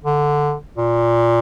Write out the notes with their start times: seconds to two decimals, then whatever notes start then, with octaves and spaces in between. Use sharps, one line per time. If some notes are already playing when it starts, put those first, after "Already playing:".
0.04 D3
0.77 A#2